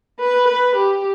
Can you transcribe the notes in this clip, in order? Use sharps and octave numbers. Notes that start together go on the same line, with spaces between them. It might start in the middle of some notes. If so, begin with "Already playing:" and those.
B4
B4
G4